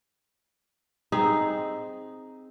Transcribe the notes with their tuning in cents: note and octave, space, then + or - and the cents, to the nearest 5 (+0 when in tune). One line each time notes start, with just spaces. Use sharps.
C4 +0 D#4 +0 G#4 +0